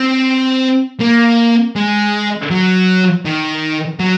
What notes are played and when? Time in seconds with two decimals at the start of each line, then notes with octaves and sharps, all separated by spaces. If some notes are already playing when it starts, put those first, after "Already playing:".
Already playing: C4
1.00 A#3
1.76 G#3
2.50 F#3
3.25 D#3
4.00 F#3